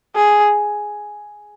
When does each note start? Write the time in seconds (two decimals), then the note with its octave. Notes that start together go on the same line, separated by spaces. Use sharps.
0.15 G#4